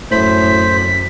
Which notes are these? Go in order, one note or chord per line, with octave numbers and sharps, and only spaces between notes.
F#2 A2 C5 B6